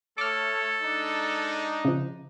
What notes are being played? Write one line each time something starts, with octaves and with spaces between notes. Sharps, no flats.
A3 A4 C#5 D6 F6
G#3 D4 D#4
C#3 F3